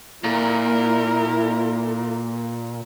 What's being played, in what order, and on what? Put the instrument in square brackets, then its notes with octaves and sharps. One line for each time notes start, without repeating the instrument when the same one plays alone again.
[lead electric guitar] A#2 [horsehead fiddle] E4 A#4